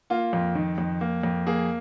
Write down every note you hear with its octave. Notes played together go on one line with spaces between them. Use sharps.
A#3 F4
F2
D#3
F2
A#3
F2
A#3 G#4